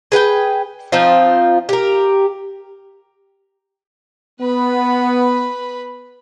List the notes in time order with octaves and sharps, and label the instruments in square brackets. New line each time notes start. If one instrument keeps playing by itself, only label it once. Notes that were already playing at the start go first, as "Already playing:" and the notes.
[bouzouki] G#4 B4 F#5 G5
F3 C4 D#4 F4
G4 A#4
[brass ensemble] B3 [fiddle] B4 B5